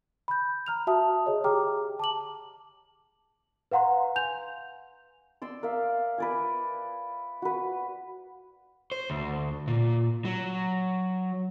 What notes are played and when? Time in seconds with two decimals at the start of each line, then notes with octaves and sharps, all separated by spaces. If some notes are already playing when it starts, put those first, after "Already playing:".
0.28 B5 G6
0.67 A#5 F6 F7
0.87 F#4 E5 A5 D#6
1.26 G#4 C#5 D#5
1.44 G4 G#4 G5 A#5 D6 F6
1.99 A5 D6 F#7
3.72 B4 F5 F#5 A#5 C6
4.16 G#5 G6 F7
5.42 D5 C6 E6
5.63 A#4 D5 E5 F5
6.18 B4 D5 G#5
7.42 F#4 B4
8.92 C5
9.10 D2
9.68 A#2
10.25 F#3